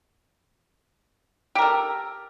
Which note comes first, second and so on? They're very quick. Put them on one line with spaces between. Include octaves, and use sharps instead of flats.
G4 A#4 A4